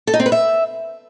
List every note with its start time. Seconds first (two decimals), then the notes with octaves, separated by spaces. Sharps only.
0.07 A4
0.14 D#4
0.20 C4
0.26 B4
0.32 E5